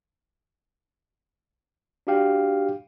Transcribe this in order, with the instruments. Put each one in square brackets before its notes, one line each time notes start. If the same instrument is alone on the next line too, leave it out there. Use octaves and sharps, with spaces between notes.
[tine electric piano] D4 F#4 G4 F5 G5